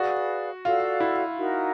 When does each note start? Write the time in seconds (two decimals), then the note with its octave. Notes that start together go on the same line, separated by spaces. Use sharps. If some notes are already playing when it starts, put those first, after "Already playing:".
Already playing: F#4 G#4 B4 D5 F5
0.65 F4 F#4 A4 D5 F5
1.00 E4
1.37 D#4 F#4 A#4